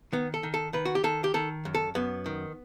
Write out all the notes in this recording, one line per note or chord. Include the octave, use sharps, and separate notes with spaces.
D#3 B3
A4
D#3
A4
D#3 B4
F#4
G4
D#3 A4
G4
D#3 A4
F#2
A4
F#2 B3
D#3